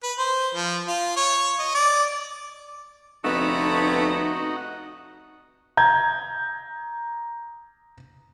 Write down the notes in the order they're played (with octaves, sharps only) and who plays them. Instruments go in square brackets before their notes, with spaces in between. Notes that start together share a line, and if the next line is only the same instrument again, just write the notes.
[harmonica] B4
C5
F3
F4
C#5
D#5
D5
[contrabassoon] F1 [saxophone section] D3 A3 B3 [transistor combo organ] D#4 F#4
[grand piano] A#5 G6 G#6